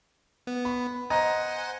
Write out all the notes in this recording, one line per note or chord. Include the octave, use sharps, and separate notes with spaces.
B3
B5
C5 D#5 F#5 G#5 A#5 A#6